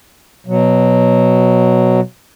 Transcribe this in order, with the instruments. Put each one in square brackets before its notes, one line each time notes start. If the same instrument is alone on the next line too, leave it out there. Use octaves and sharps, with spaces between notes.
[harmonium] B2 F#3